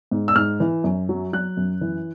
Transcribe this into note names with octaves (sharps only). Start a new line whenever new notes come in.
G#2
E6
G#2 F6
E3
F#2
F#3
F#3 F#6
F#2
E3